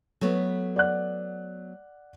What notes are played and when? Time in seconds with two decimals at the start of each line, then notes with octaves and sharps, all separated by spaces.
0.21 F#3 A3 B3
0.76 D5 F#5 F#6